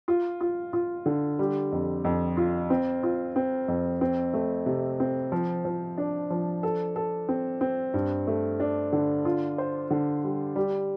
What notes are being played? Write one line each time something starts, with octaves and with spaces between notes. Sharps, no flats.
F4
F4
F4
D3
G3
F2
F2
F4
C4
F4
C4
F2
C4
A3
C3
C4
F3
F3
D4
F3
A4
A4
C4
C4
G2
A3
D4
D3
F4
C5
D3
G3
G3